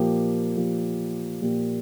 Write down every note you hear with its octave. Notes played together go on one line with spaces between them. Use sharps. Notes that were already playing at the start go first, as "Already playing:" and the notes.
Already playing: A#2 F3 A#3 G4
A#2 F3 A#3 G4
A#2 F3 A#3 G4